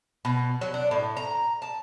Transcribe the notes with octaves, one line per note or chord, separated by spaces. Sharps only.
B2
F#3
D4
A2
A#5
A5